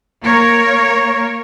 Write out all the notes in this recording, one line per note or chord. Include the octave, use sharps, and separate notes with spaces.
A#3 A#4 C#5